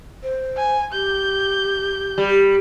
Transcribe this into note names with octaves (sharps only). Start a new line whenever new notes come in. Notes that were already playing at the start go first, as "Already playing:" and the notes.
C5
G#5
G4 G6
G3